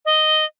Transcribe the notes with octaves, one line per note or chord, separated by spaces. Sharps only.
D#5